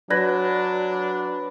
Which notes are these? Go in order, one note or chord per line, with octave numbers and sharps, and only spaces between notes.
F#3 D4 B4 D5 G#6 A#6